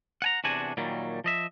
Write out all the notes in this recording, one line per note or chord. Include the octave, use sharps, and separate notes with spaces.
F#5 G#5 A#5
E2 C3 D4 F#4 G#5
A#2 D#3 F#3 G3
F3 D#5 E5